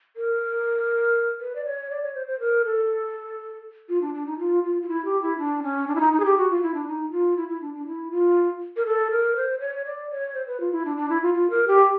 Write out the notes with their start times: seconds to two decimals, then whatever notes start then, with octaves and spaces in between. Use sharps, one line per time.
0.16 A#4
1.40 B4
1.55 D5
1.65 C#5
1.90 D5
2.03 C#5
2.15 C5
2.27 C5
2.40 A#4
2.65 A4
3.89 F4
4.01 D4
4.14 D4
4.26 D#4
4.39 F4
4.63 F4
4.82 F4
4.88 E4
5.05 G4
5.21 E4
5.38 D4
5.62 C#4
5.87 D4
5.95 E4
6.00 D#4
6.13 D#4
6.20 G#4
6.25 G4
6.37 F#4
6.50 F4
6.63 E4
6.74 D4
6.87 D#4
7.11 F4
7.37 E4
7.48 E4
7.61 D4
7.73 D4
7.86 E4
8.11 F4
8.76 A#4
8.86 A4
9.11 A#4
9.36 C5
9.60 C#5
9.85 D5
10.10 C#5
10.34 C5
10.47 B4
10.60 F4
10.72 E4
10.85 D4
10.97 D4
11.09 E4
11.22 F4
11.34 F4
11.50 A#4
11.67 G4